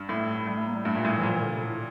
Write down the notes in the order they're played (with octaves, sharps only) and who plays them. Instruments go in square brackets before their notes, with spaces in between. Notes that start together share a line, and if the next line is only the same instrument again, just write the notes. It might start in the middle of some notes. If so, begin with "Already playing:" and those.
Already playing: [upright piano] G2
[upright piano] A2 [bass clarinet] A3
[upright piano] A2 [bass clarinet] G3
[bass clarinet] A3
A#3
G3
[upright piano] G2 [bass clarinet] A3
[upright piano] A#2
A2
[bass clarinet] E3
[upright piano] A#2 [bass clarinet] F3
[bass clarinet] E3
D3
C3
A2